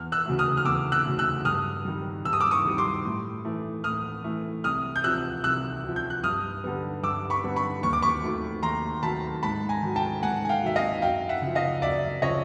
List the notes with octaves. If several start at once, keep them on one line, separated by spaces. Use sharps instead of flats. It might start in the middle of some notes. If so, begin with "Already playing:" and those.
Already playing: E2 F6
E6 F#6
C#3 F#3 A3
D#6 F6
F6
E2 D6 E6
E6 F#6
C#3 F#3 A3
E6 F#6
G2 D#6 F6
D#3 G3
G2 E6
D#6
D6 E6
C#6 D#6
D#3 G3
C6 D6
A2
E3 A3
A2 D#6 F6
E3 A3
C2 D#6 F6
G6
C3 F3 E6 F#6
C2 E6 F#6
C3 F3
G6
F#6
G2 D#6 F6
D3 G3 B3
G2 D6 E6
B5 C#6
D3 G3 B3
B5 C#6
D#2 C#6
D6
B5 C#6
D#3 F#3 A3
D#2 A#5 C6
D#3 F#3 A3 A5 B5
G#2 A5 B5
G#5 A#5
D#3 F#3
G5 A5
G#2 F#5 G#5
G#5
F5 G5
D#3 F#3 E5
D#5 F5
F#2 F5 G5
E5 F#5
C#3 F3
D#5 F5
F#2 D5 E5
C#3 F3 C#5 D#5